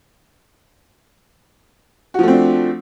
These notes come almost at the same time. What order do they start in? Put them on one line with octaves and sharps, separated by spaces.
F#4 F3 A3 C4 D4